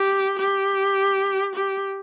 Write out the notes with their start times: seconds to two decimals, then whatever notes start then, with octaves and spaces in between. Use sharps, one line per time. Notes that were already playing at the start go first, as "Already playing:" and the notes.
Already playing: G4
0.39 G4
1.55 G4